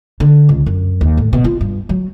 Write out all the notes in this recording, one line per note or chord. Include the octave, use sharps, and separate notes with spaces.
D3
C#2
F#2
D#2
A2
B2
F4
G2
F#3